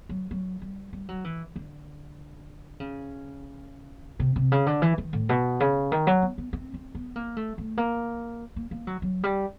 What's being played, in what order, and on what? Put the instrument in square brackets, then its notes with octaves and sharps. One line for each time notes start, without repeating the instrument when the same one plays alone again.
[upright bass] F#3
F#3
G3
G3
F#3
E3
D3
C#3
C3
C3
C#3
D3
E3
D#3
A2
B2
C#3
D#3
F#3
B3
B3
C4
C4
B3
A#3
A3
A3
A#3
A#3
A#3
F#3
F#3
G3